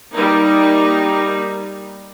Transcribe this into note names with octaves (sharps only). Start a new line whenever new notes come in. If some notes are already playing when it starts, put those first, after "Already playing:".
G3 A#3 D#4